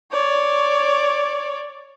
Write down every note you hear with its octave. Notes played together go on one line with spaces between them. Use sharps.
C#5 D5